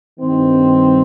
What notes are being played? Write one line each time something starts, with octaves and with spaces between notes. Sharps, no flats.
G2 D#3 C4